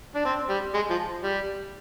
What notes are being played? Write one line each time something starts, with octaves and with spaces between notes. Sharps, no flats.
D4
C4
G3
G#3
F3
G3